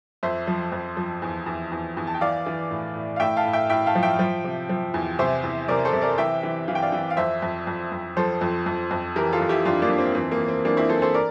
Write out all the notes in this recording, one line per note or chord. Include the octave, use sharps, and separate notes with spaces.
F2 C5 E5
F3
F2
F3
E2
E2
E2
E2
A5
G5
E3 D5 F5
E3
A2
A2
F5
A2 E5 G5
F5 A5
A2
E5 G5
A2 E5 G5
F5 A5
F3
E5 G5
F3
C3
F3
E2
C3 C5 E5
E2
C3 A#4 D5
A4 C5
C3
A#4 D5
E3 E5 G5
E3
E3 F5
G5
D5 F5
E3
F5
F2 C5 E5
F2
F2
F2
F3 A4 C5
F2
F2
F2
E3 G4 A#4
F4 A4
F2
E4 G4
F2 D4 F4
A#3 D4
F2
C4
E3 C4
A#3
E3
C4
E3 A#3 D4
C4 E4
E3 A4 C5
A4 C5
A#4 D5